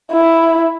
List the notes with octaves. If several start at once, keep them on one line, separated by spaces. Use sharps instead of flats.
E4